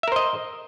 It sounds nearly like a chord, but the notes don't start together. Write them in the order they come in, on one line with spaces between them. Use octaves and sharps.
E5 A#4 C5 D#5